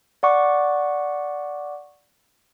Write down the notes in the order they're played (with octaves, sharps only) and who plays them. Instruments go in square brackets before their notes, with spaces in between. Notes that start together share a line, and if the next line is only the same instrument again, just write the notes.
[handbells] D5 F#5 C#6 D6